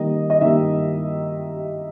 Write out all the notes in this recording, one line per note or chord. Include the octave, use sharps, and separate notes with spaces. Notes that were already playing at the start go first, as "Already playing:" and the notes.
Already playing: D#3 G3 A#3 D#5
D#5
D#3 G3 A#3 E5